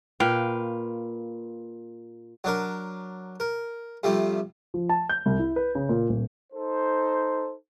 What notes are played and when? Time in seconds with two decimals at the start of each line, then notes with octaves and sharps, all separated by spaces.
0.20 A#2 B4 F5 G5
2.44 F#3 D4 A#4
3.40 A#4
4.03 C3 F3 G3 A3
4.74 F3
4.89 A5
5.09 G6
5.26 C2
5.39 E4
5.56 B4
5.75 C#3
5.89 A#2
6.09 D#1
6.53 D#4 A4 C5